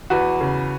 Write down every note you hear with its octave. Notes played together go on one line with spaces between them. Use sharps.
E2 F#4 B4
C#3